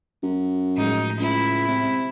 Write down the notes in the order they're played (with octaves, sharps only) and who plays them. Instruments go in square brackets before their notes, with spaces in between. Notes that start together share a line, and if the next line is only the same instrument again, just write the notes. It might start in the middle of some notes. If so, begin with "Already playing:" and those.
[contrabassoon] F#2
[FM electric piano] A2 F3 G#3 [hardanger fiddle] D#4
[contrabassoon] C#2 [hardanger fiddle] E4
[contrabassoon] C3